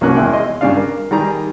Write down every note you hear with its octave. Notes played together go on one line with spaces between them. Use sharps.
C2 F#3 A#3 C#4 F#6
E2 G#3 E4 G5
D#5 C6
G2 C#3 D4 F5
A#4
D#3 G3 G#4 A#5